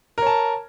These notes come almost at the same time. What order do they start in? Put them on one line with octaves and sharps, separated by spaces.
A#4 C#5 A5